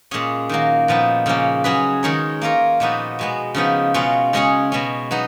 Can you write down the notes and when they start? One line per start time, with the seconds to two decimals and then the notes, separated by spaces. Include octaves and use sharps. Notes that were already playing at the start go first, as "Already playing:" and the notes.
0.11 A#2 G#3 C#4 G#4
0.49 D#3 F#3 A#3
0.88 A#2 F3 B3 D#4
1.26 C#3 F3 A#3 C#4
1.64 F#3 C#4 G#4 B4
2.03 D#3 G#3 D#4 A#4 C#5
2.41 A#3 F4 A#4 C#5
2.80 A#2 F3 B3 D#4 F#4
3.19 B2 G#3 B3
3.54 C#3 F3 B3 D#4
3.94 B2 G#3 C#4 F4
4.33 C#3 G#3 C#4 G#4 C#5
4.72 B2 G#3 C#4
5.11 F#3 B3 D#4